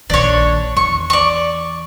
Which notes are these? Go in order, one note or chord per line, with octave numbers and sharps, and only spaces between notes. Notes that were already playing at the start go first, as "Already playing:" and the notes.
A#1 D#3 D4 C#5
E2 C#6
D5 C#6